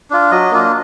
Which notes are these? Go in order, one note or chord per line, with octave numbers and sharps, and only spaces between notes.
D4 F4
F#3 D#5
A#3 D4 F4